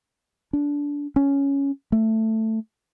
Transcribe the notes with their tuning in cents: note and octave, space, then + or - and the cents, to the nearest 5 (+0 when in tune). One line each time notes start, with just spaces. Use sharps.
D4 -20
C#4 +5
A3 +10